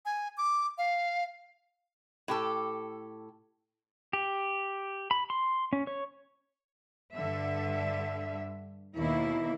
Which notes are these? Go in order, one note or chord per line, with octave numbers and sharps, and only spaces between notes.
G#5
D6
F5
A2 G4 A4
G4
B5
C6
C#4
C#5
G2 D3 E5
D#2 B2 A#3 E4